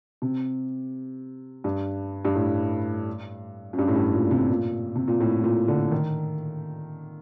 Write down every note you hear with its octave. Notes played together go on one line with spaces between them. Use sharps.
C3
G2
G2
A2
F#2
G2
A2
G2
A#2
C3
A#2
C3
A#2
A2
A#2
D3
D#3